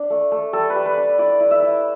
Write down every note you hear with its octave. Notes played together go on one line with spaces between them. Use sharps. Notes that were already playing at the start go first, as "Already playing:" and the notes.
Already playing: D4
A3
A3
G3 A4
B4
G3
B4
D4
E4 D5
E4
E5
E4